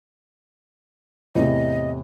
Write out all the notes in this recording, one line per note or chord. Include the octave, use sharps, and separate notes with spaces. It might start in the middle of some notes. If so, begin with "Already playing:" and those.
E2 A2 C3 D#5